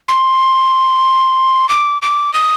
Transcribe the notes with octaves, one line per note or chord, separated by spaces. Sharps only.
C6
D6
D6
D#6